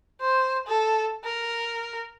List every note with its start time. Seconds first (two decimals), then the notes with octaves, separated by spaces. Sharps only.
0.21 C5
0.67 A4
1.24 A#4